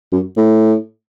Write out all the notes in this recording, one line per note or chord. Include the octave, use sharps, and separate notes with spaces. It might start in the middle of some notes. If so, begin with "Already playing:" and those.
F#2
A2